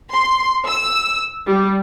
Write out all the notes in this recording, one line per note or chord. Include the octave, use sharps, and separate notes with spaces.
C6
E6
G3